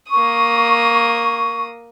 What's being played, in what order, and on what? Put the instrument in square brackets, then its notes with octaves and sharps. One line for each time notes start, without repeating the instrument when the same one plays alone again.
[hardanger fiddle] A#3 D#6 [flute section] C#6